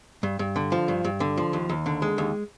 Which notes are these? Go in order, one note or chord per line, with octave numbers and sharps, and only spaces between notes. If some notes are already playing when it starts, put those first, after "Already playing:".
G2
G2
D3
F3
G2
G2
D3
F3
D#2
D#2
D3
G#3
D#2